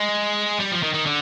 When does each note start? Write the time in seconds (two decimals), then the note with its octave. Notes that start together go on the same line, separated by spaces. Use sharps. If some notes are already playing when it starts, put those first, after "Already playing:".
Already playing: G#3
0.60 G3
0.72 F3
0.83 D#3
0.94 D#3
1.06 D3